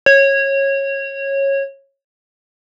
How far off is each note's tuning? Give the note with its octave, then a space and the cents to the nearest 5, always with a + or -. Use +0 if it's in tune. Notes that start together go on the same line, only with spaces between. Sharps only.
C#5 -15